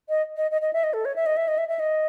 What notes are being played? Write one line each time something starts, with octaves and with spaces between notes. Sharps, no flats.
D#5
D#5
D#5
D#5
E5
D#5
A4
C#5
E5
D#5
E5
D#5
E5
E5
D#5